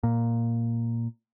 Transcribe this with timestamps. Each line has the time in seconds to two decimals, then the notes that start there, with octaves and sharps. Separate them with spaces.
0.03 A#2